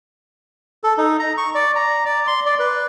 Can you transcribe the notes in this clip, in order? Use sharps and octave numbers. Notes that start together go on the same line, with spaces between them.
A4
D#4
A#5
C#6
D5
A#5
D5
C6
D5
B4